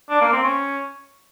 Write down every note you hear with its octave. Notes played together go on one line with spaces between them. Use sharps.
D4
A#3
C4
C#4